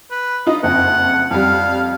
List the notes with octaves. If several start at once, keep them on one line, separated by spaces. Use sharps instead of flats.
B4
D#4 F4 D#5
F#1 F2 F#5
F2 G3 F5